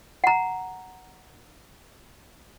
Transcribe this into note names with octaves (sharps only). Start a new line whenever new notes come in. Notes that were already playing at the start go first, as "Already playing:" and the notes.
F#5 A#5